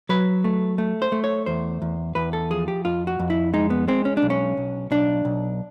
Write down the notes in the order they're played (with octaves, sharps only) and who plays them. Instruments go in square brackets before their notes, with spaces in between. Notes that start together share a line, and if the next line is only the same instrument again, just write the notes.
[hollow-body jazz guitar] F#3 B4
A3
A3
C5
A3
C#5
E2 C5
E2
E2 B4
A4
F3 G#4
G4
F2 F4
F#4
F2
E4
G#3 D#4
B3
G#3 C4
C#4
D4
B1
C#4
B1
B1 D4
B1